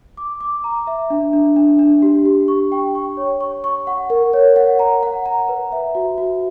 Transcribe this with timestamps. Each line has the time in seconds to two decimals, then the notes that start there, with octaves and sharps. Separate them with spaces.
0.17 D6
0.41 D6
0.64 A#5
0.87 E5
1.10 D4
1.33 D4
1.56 D4
1.79 D4
2.02 G4
2.25 G4
2.48 C#6
2.72 G5
2.95 C#6
3.17 C#5
3.41 C#6
3.64 C#6
3.87 F#5
4.10 A#4
4.33 C#5
4.56 F#5
4.79 A#5
5.03 F#5
5.26 A#5
5.49 B4
5.72 E5
5.95 F#4
6.18 F#4